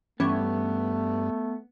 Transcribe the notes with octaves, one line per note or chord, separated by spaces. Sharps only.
G2 E3 G3 A3 B3 C#4